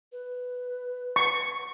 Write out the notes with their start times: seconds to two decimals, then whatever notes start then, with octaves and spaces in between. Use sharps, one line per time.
0.12 B4
1.16 C#6